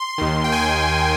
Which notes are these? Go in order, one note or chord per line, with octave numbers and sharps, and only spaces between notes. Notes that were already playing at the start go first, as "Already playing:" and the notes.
Already playing: C6
D#2 D#3
G5
G#5